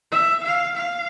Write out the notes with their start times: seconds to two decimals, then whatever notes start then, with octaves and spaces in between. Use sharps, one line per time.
0.12 E5
0.44 F5
0.75 F5